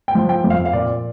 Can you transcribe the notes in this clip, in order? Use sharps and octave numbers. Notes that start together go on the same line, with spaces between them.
G5
F3
G5
F2
F5
F5
A#2 D5